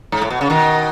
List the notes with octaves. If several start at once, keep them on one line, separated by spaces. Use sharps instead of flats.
G#2
A2
B2
C#3
B2 D#3